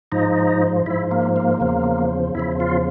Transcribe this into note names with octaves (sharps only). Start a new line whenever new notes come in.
G#2 F3 D#4
G#2 F3 E4
A#3
A#3
E2 C#3 F3
E2 C#3 F3 E4
F4